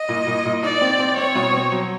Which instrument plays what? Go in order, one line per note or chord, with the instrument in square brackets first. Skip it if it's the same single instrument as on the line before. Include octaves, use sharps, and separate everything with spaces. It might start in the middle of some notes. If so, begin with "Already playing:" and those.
Already playing: [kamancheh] D#5
[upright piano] A#2
A#2
A#2
[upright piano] D#4 [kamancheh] D5
[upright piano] C4
C4
[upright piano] C4 [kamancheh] C#5
[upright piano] B2
C4
F#3